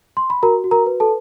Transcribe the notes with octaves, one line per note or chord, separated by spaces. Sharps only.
C6
B5
F#4 A#4 A#5
F#4
A#4 A#5
B4
A4 A5